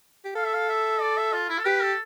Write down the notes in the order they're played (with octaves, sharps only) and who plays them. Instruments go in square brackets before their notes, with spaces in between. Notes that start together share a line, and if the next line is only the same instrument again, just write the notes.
[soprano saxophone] G4
[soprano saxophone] A4 [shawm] F5
[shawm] E5
F5
E5
D5
E5
F4
E4
A4
[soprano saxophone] G4 [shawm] B4
[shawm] A4